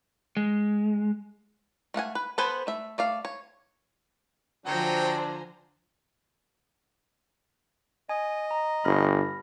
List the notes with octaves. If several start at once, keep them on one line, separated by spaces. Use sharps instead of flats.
G#3
A3 F5 F#5 G#5
B4
B3 A4 B4 C5 G#5
A3 E5
A3 D5 F5
C#5
D3 F3 F#3 D4 C5 G5 G#5 A#5
D#5 G#5
A#5
G1 B5 F6 A#6